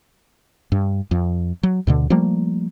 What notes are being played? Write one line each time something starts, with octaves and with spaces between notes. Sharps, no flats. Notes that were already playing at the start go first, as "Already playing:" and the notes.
G2
F2
F#3
D2 B2 D3
F3 G3 A3 A#3